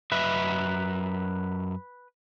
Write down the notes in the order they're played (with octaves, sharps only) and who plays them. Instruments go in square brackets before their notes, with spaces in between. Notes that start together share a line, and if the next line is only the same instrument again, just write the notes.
[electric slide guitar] F#2 D#5 E5 [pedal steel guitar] B4